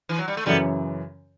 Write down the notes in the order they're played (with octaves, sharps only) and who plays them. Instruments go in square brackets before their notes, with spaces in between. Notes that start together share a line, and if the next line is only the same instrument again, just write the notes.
[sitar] E3
F#3
G3
A3
[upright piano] F#2 C#3 E3 [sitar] G3 B3